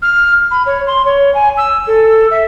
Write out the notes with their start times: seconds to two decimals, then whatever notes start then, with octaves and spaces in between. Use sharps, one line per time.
0.02 F6
0.51 B5
0.66 C#5
0.87 C6
1.05 C#5
1.34 G#5
1.57 E6
1.87 A4
2.31 E5